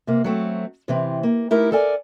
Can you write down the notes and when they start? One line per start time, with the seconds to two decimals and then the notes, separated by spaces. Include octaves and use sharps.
0.07 C3 A#3
0.24 F#3 A3 C4
0.88 C3 E3 C4
1.23 A#3
1.51 A3 D#4 E4 G4 A#4
1.72 A4 A#4 D5 G#5